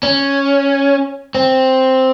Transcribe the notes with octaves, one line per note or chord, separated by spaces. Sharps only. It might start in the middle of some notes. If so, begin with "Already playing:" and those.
C#4
C4